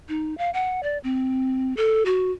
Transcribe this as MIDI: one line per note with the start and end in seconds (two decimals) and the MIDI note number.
0.09 0.37 63
0.38 0.50 77
0.54 0.81 78
0.83 0.98 74
1.04 1.76 60
1.77 2.03 69
2.06 2.31 66